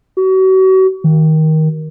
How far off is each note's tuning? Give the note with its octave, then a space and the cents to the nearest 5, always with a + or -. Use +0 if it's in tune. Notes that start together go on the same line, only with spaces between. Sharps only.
F#4 +35
D#3 +15